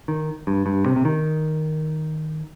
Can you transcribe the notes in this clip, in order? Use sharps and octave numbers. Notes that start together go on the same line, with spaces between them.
D#3
G2
G2
C3
C3
D#3